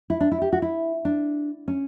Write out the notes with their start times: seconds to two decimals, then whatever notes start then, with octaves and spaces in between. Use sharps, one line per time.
0.10 E4
0.21 D4
0.32 E4
0.42 G4
0.53 F#4
0.62 E4
1.05 D4
1.68 C#4